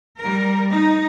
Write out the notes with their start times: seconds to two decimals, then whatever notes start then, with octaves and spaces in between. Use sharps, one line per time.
0.18 G3 A#4
0.72 D#4